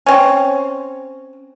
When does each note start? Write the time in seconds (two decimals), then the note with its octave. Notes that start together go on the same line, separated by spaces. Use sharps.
0.06 C4 C#4